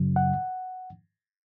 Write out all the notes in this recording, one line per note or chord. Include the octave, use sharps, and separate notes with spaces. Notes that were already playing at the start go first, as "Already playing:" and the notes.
Already playing: F#2 C#3 F#3
F#5